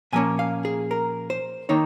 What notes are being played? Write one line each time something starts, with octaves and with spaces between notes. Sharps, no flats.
A#2 F3 A#3 C#4 G#5
F5
G#4
A#4
C5
D#3 A#3 D#4 C#5